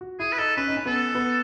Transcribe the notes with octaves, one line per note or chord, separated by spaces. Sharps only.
F#4
E4 G#4
B4
D#4 A4
C#4 B4
D#4
C#4
B3 A4
B3